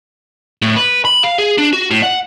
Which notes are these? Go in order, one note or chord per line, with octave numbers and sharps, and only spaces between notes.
A2
B4
B5
F5
G#4
D4
F#4
A2
F#5